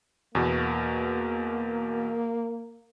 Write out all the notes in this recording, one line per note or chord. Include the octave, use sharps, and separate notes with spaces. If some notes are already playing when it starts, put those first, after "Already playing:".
E2 B2 A#3